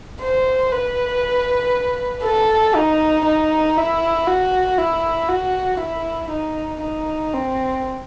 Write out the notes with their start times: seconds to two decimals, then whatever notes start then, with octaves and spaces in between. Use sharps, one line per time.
0.21 C5
0.72 B4
2.24 A4
2.75 D#4
3.26 D#4
3.77 E4
4.27 F#4
4.78 E4
5.29 F#4
5.80 E4
6.31 D#4
6.81 D#4
7.33 C4